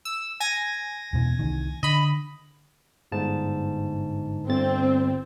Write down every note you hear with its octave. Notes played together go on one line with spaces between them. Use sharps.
E6
G#5 G#6 A#6
E2 B2 C#4
C2 C3 D#3
D3 D#5 B5
G1 G#2 A5
G1 C4 A6